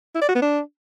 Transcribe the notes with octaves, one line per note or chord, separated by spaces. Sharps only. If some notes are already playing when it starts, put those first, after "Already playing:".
E4
D5
F#4
B3
D4